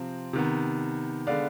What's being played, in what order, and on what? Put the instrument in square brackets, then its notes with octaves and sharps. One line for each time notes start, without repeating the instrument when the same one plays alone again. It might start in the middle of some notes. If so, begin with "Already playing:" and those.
Already playing: [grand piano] C3 F3 C4
C3 D#3 B3
D3 G#3 B3 D5 F5